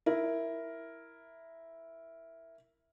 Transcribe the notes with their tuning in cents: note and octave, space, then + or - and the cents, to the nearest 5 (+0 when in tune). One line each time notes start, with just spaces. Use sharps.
E4 +0 A#4 +0